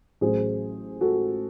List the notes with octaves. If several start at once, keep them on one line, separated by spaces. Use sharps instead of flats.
A1 A2 F#3 A3 G#4 C5
F#4 A4